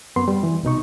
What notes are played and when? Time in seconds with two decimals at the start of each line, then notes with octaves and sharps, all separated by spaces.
0.16 F#2 B3 C6
0.28 G3
0.43 E3
0.63 C2 B2 D#4 C#6